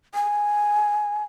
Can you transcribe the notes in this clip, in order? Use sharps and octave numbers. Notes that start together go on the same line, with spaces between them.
G#5